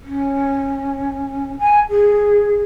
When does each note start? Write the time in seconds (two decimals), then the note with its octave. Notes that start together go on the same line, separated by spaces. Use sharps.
0.02 C#4
1.58 G#5
1.89 G#4